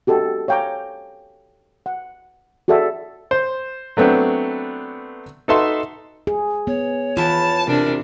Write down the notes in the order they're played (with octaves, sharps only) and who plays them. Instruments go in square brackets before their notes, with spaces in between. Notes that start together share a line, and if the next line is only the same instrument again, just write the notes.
[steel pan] F#4 G4 A4 D#5
C#5 F5 G5 G#5 A#5 D6
F#5
F#4 G#4 A4 D5 E5
[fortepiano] C5
F#3 A3 B3 C4 D4
D#4 F#4 A4 B4 E5 C6
[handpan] G#4
[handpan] B3 [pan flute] C#5
[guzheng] E2 E3 [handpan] F4 [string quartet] A5
[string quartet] C3 D4 [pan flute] A#4